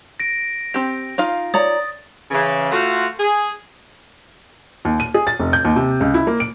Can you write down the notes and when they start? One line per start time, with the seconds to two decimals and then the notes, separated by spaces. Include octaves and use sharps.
0.20 A#6 D7
0.74 C4 G4
1.18 D#4 F4 F5
1.54 C#5 D5 A#5 D#6 A6
2.31 C#3 E3
2.72 A3 F4 F#4
3.19 G#4
4.85 D#2
5.00 D#7
5.14 G#4
5.27 A6
5.39 F1
5.53 G6
5.65 D#2
5.76 C3
6.01 C#2
6.14 E4
6.27 A#3
6.40 D7